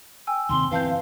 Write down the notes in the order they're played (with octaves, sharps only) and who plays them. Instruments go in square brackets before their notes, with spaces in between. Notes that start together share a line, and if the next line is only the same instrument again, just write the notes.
[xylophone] G5 G#5 E6
[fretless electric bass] D#2 C3 C4 [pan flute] C6
[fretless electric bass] G1 E3 C4 [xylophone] B4 A5 G6 [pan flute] F5